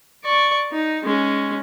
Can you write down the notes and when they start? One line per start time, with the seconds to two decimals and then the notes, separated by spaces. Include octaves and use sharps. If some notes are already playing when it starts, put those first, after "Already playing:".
0.24 D5 C#6
0.72 D#4
1.03 G#3 C#4